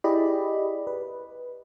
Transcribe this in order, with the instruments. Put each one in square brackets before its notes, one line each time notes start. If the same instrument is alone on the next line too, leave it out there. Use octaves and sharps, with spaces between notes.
[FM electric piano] E4 G4 G#4 D5 D#5 B5
B4